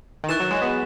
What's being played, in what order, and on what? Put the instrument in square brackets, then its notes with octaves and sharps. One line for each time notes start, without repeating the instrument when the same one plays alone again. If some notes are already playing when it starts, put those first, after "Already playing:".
[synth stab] D#3
[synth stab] E3 [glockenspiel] C#6 F#6 A6 E7
[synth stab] F#3
G#3
B3